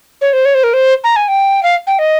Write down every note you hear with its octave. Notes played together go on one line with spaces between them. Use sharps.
C#5
C5
C#5
C5
A#4
C5
A#5
G#5
G5
F5
G5
D#5